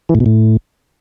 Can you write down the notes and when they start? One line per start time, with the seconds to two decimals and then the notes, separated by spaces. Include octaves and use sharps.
0.09 E3
0.15 A2
0.20 B2
0.26 A2